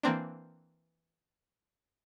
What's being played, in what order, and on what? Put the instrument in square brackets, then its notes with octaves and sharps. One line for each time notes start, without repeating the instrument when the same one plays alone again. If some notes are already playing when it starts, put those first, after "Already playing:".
[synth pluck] E3 A#3 C4 D4